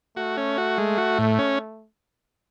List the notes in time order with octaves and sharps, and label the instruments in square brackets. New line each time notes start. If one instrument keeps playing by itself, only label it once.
[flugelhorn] A3 [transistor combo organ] F#4
[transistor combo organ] C#4
F#4
G#3
F#4
A2
C#4